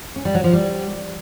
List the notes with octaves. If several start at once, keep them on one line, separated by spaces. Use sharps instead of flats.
C#4
G3
F#3
F3
G3